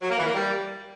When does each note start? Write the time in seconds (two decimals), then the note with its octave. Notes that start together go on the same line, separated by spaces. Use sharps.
0.02 F#3
0.10 A#3
0.18 E3
0.26 A#3
0.34 G3